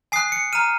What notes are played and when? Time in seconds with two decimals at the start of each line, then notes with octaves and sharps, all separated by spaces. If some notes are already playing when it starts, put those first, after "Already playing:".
0.12 G#5 D#6 F#6 C7
0.32 C#7
0.53 A#5 F6 D#7